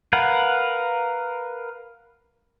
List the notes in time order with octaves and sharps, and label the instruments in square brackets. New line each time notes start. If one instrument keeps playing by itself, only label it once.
[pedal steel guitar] A#4 B4 F5 F#5